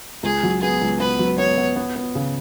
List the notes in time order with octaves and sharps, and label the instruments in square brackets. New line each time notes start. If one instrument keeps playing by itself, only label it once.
[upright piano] C#2 [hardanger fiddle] G#4
[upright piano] F#3
[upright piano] B3 [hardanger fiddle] G#4
[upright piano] C#2
[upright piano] B3 [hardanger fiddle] B4
[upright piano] F#3
[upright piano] B3 [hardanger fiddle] C#5
[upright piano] B3
B3
B3
C#3